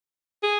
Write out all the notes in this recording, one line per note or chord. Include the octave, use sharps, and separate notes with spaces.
G#4